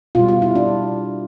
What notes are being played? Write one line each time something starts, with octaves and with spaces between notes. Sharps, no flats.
B2 G3 F4
F4
E4
D4